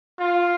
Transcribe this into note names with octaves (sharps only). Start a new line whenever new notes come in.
F4